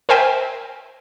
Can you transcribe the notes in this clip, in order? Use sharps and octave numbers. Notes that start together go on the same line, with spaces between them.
A#4 C5 E5 G5 G#5